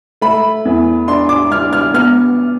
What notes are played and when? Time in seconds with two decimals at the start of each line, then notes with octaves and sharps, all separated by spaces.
0.22 A3 B5
0.65 E2
1.08 D4 C6
1.29 D6
1.51 D4 F6
1.73 F6
1.94 B3 F6